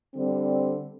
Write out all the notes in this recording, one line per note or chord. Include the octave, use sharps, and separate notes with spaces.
D3 G3 C4